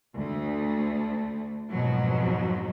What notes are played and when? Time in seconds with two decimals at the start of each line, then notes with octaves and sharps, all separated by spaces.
0.15 D2 A3
1.72 F2 G#2 B2 F3 F#3